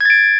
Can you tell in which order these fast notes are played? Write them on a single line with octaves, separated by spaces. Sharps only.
G#6 A6 D7